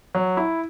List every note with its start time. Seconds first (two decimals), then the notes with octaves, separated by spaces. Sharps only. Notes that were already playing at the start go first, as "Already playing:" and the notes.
0.15 F#3
0.37 E4